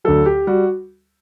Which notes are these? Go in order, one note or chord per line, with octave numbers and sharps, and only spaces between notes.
D2 D3 F#3 A4
G4
G3 F#4